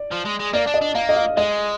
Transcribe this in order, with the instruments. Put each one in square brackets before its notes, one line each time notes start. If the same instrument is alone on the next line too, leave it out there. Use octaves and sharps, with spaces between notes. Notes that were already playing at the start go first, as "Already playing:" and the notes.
Already playing: [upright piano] D5
[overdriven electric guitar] F3
G#3
G#3
[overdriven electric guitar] A#3 [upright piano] D5
[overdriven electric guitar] D4
[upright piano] D#5
[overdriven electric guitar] D4
[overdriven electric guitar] A#3 [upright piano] F5
[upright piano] D#5
F5
[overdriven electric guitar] G#3 [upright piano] D#5